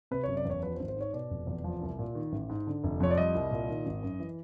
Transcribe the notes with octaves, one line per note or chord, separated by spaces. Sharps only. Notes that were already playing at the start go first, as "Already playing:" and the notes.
C3 B4
C#5
F#1
D5
E2 C#5
F3 B4
C5
G#1
C5
G#2 C#5
B2 D5
F1
E2
F3
C2
A#2
D#3
A1
G#2
D3
F1
F2 C#5
D5
G3 D#5
C2
A#2
D#3
G#1
F#2
E3